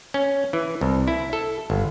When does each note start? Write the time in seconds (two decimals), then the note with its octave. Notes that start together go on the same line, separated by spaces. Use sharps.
0.14 C#4
0.53 E3
0.81 C2
1.07 E4
1.33 A4
1.70 G1